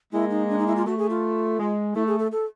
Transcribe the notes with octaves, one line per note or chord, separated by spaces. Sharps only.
G#3 A#3 E4
D#4
D4
D#4
E4
F4
A3 F#4
G#4
F4
G#3
A3 E4
G#4
A4
A4